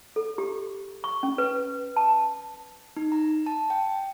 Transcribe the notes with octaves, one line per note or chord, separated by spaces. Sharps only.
A4
G4
C#6
C#4
B4
A5
D#4
A#5
A5
G5